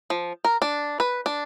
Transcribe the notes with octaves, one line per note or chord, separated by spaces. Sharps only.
F3
A#4
D4
B4
D4